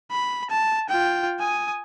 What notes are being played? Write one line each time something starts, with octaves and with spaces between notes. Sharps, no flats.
B5
A5
F4 G5
G#5 D#6